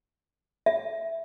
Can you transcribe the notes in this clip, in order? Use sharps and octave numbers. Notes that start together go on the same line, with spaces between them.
E5